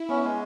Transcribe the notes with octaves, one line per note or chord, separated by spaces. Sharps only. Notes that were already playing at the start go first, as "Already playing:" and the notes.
Already playing: E4
B3 C#4
G#3 B3